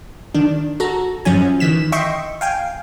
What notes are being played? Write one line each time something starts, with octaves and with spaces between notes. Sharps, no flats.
D#3 D4
F#4 A4 A#5
F#2 F3 F#3 C#4 G#5
D#3 E3 B6 E7
D#5 E5 G5 C6 C#6
F5 G5 G#5